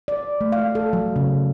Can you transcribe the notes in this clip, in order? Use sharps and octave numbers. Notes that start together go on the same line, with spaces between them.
D5
A3
F5
A4
F#3
C#3